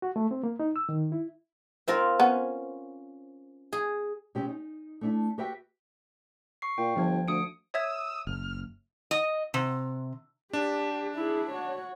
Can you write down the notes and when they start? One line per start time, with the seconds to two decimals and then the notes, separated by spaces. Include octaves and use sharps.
0.02 F#4
0.16 A3
0.31 C4
0.44 A#3
0.60 D#4
0.76 E6
0.89 D#3
1.12 E4
1.88 C4 F4 A#4
2.20 B3 C#4
3.73 G#4
4.35 C3 G#3 C#4 G4
4.49 D#4
5.01 A3 D4 E4
5.38 F#4 G4 B4 E5 G5
6.62 C#6 C7
6.78 A#2 G5
6.96 G1 F3 G#6
7.28 D2 D#6 C#7 D7
7.74 C#5 E5 D#6 E6 G#6
8.27 F#1 F6
9.11 D#5
9.54 C3
10.53 D4 G4
11.15 E4 G#4
11.50 F#4 C#5